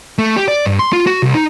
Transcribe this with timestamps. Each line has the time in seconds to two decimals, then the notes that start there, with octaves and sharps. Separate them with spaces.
0.18 A3
0.37 G4
0.48 D5
0.66 G2
0.79 C6
0.93 F4
1.07 F#4
1.23 C2
1.35 D#4